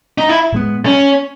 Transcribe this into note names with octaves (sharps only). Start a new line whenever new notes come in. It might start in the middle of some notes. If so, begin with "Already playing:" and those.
D#4
E4
A2 G#3 B3
C#4